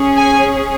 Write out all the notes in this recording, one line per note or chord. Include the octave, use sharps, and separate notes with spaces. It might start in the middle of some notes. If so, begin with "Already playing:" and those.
Already playing: C#4 G#4
G#5